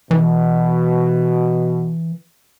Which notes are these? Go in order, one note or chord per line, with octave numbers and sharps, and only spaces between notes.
B2 E3